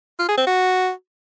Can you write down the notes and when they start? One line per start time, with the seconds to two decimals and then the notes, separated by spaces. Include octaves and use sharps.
0.19 F4
0.28 G#4
0.38 C4
0.47 F#4